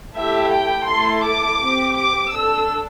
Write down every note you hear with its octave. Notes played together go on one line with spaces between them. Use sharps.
A3 E4 G4 E5
G5
A3 E4 A4 C6
D6
C4 G4
D6
D4 A4 E6